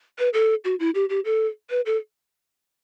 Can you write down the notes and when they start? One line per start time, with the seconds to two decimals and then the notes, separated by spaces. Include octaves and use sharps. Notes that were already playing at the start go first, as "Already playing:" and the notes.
0.19 B4
0.34 A4
0.65 F#4
0.80 E4
0.95 G4
1.09 G4
1.25 A4
1.70 B4
1.86 A4